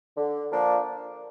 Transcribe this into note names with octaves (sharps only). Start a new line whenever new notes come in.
D3
F3 A#3 D4